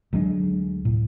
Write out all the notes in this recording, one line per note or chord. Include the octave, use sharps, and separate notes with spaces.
D2 F#3 G#3 D4
A2